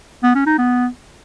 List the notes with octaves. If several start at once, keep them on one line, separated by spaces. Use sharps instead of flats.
B3
C#4
D#4
B3